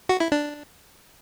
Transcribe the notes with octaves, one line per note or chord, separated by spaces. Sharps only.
F#4
E4
D4